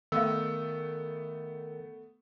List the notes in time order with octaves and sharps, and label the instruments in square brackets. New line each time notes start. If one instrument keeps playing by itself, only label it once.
[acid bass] D#3 [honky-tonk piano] A3 B3 [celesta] F5 E6